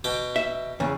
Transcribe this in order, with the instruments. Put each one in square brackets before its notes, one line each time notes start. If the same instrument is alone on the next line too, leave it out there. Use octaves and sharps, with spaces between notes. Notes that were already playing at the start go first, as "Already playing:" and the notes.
[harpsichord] B2 G5 D6
[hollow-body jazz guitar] E5
E2 C#3